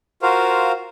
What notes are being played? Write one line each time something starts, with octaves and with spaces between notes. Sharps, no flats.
F4 F#4 A#4 C5 F5